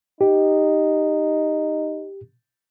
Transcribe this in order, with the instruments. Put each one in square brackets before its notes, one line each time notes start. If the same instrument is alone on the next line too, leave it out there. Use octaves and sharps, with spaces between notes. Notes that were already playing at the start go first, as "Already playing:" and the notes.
[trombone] D#4 [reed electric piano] G4